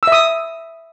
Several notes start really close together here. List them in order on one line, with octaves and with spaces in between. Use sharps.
E6 E5 D#6